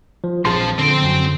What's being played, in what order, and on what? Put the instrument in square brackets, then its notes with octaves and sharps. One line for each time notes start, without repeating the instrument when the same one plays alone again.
[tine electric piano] F3
[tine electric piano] A#1 A5 [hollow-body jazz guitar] F2 G#4 C6 [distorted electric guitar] F3
[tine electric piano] D3 [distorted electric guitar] C4 G5
[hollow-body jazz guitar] F#2